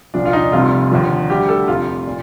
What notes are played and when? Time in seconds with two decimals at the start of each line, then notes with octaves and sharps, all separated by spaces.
0.14 C2 A#2 F3 D4
0.25 F4
0.33 D#4
0.52 F1 F2 C3 G3 F4
0.91 D#2 D3 F3
1.30 D2 D3 G3 G4
1.49 A4
1.68 F1 F2 C3 G3 F4
2.07 A#2